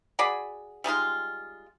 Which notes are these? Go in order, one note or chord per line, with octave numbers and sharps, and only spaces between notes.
F#4 G#4 D5 B5
G3 G#3 D#4 F4